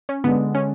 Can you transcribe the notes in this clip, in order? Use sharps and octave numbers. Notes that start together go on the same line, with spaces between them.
C#4
D3 G#3 B3 D4
C#4